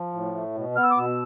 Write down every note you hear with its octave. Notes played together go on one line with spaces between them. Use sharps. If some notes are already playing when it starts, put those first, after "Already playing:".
Already playing: F3
A2
A3
B2
B3 F6
E6
D6
B2 E6